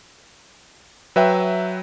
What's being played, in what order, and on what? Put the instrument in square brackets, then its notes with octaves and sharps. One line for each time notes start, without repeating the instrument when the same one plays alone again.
[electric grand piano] F#3 B4 E5 G5